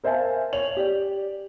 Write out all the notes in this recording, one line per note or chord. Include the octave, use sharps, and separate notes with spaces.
A#4 C5 E5 F5 G#5 A5
C#5 F7 F#7
G4 D5